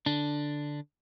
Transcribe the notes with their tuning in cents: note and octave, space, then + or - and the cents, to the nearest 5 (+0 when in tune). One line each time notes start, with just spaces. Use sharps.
D3 +0 D4 +0